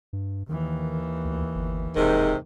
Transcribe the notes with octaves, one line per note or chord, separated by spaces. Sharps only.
G2
D#2 D#3 E3
D2
G1
E1 G#2 C3 D#3